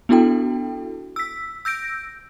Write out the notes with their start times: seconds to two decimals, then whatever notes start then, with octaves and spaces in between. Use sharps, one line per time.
0.09 B3 D4 E4 F#4 A4 G5
1.16 E6 B6
1.65 E6 G6 A#6 D7